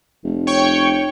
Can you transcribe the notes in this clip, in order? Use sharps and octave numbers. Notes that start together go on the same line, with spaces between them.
F1
C#5 G5 C#6